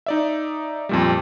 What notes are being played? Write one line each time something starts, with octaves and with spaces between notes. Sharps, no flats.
D#4 D5 E5
F2 A#2 G3